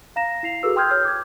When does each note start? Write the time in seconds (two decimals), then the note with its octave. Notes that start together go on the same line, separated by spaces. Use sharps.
0.16 F5 A#5 A#6 E7
0.43 E4 C7 F7
0.63 F#4 G#4 A4 B4 E6
0.76 G5 C6 D#6 F6 G6 G#6
0.91 C#5 F6 G6
1.05 D6 G#6